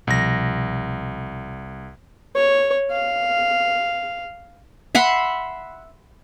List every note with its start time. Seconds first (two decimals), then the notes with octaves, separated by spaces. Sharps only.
0.07 C2 B2 F3 A#6
2.36 C#5
2.91 F5
4.95 E5 F#5 B5 C6